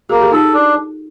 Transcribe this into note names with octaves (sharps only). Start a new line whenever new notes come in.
A#3 F#4 G#4
G4 A4
D#4 F4 A4
D4